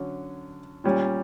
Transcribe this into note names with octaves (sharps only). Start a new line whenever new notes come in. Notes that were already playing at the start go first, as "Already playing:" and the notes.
Already playing: D3 F#3 C#4
A#2 G3 C#4